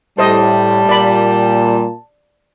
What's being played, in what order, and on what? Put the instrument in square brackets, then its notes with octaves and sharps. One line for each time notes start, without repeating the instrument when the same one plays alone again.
[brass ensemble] A2 [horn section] G3 [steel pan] C5 D#5 [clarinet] A5
[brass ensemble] A#2 [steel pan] D5 B5